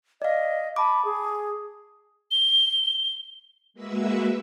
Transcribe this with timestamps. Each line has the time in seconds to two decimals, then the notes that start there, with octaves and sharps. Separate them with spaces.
0.22 D5 D#5 F5
0.76 A5 B5 D6
1.05 G#4
2.31 G7
3.74 G#3 A#3 F#4 B4 E5 E6